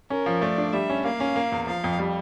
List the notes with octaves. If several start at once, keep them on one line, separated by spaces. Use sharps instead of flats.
C#4 A#4
F3
A3 D5
D4
G3 E5
C#4
A#3 F5
C#4
A#3
E2
F3 F5
F2
G3